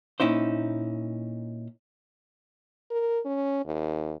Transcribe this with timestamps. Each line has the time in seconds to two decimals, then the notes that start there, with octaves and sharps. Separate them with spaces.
0.20 A#2 C#4 D#4 E4 C5
2.91 A#4
3.26 C#4
3.65 D#2